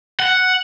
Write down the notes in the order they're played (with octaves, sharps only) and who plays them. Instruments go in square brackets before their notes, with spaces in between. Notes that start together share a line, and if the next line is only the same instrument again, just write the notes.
[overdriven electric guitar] F#5